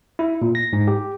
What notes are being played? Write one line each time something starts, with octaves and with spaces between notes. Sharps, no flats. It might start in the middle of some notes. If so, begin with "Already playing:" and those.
E4
A#2
A#6
G#2
G4